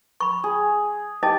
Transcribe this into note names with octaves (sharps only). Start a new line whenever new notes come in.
B5 C#6
G#4
D#4 G4 D#5 A5